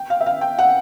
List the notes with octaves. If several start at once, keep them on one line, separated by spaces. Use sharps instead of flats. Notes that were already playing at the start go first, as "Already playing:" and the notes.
Already playing: G5
F5
E5
F5
G5
F#5